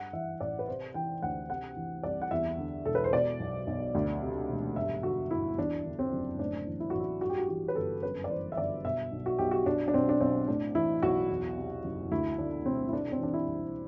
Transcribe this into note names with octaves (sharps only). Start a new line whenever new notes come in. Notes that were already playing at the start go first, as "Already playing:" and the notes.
Already playing: G2 F#5
E3 E5
A1 D5
B4
C3 C5
E3 G5
D2 F#5
C3 F#5
E3
C2 D5
F#5
E2 E5
D3
E1 A4
B4
C5
B2 D5
B1
B1
D2
C3
E1
G2 E5
D3 F#4
G1 E4
E2 D4
D3
C4
F#1
A2 D4
E3
E4
A1 F#4
E4
G2 F#4
G4
F#4
E3 F#4
B4
G1 A4
F#2 B4
D5
E3 C5
E5
G1 D5
B2 E5
B1
F#4
B1 G4
F#4
B2 D4
D4
B1 C4
D4
B1 C4
A2 D4
E3 E4
B1 F#4
E2
C3
F#1
D2 E4
D3 D4
E1 C4
E4
C3 D4
C4
E3 D4
E4
C2